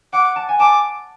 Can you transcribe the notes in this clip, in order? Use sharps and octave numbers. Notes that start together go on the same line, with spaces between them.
F#5 D6
A5
G#5
A5 D6